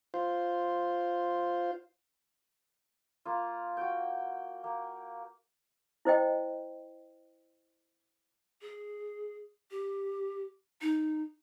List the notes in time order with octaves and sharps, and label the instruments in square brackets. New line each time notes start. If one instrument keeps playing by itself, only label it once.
[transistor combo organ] F4 C5
[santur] A#3 F4
F#4 G5
A#3
[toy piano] E4 C5 D#5 G5
[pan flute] G#4
G4
D#4